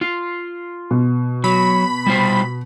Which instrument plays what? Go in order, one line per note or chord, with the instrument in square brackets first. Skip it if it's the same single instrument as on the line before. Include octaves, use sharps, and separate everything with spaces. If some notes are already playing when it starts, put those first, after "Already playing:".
[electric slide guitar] F4
[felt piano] B2
[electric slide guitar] F#3 [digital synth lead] B5
[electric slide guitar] G3 F4 C5